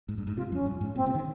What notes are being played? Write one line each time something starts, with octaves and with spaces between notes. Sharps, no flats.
G#2
G2
G#2
C3 F4
F2 C#4
G2
G#2
A#2 C4
C3
D#3